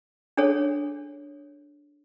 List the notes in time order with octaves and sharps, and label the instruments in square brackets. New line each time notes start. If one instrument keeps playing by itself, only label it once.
[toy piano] D4 G#4 A4 C#5